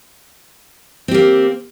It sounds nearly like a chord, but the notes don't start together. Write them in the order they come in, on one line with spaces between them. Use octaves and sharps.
C4 G4 A#3